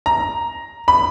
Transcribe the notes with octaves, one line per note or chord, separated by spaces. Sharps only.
A#5
B5